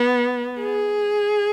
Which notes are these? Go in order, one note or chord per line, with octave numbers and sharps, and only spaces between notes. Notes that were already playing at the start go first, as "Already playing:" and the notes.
Already playing: B3
G#4